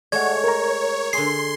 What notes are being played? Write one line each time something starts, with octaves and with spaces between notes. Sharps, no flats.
G#3 A3 C#5 D5 F#5 G#6
A#4 A#5
D3 G#4 C6 C7